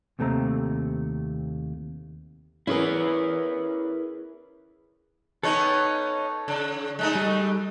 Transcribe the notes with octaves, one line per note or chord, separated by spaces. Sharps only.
D#2 C3 A3 C4 A#5
C#4 E4 G#4 A#4 B4
B3 C#4 D#4 A4 C#5 G5
C#3
G#3 A3 D#4
G3